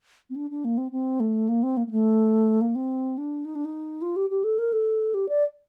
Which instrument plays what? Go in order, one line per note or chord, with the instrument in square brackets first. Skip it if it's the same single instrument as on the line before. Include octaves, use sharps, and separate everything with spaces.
[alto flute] C4
D4
D4
A#3
C4
C4
A3
A#3
C4
A#3
A#3
A3
A#3
C4
D4
D#4
D4
D#4
F4
G4
G4
A4
A#4
A4
G4
D5